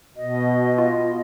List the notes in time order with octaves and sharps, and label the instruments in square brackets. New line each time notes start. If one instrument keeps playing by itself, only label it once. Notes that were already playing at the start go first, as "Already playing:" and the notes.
[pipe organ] B2 [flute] D#5
[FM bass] F4